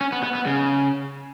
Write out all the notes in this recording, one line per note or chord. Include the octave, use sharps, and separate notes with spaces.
C#4
B3
B3
B3
C#3